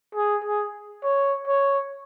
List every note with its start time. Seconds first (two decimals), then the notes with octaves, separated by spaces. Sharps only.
0.15 G#4
0.44 G#4
1.04 C#5
1.47 C#5